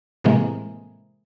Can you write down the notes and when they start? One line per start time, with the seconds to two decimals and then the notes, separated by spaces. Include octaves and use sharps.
0.24 A2 C3 E3 G#3 A#3